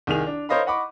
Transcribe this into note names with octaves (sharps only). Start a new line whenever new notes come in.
C2 D#3 G#4 F7
D4
A#4 C5 C#5 D#5 F5 B5
D#5 F#5 B5 C#6 D6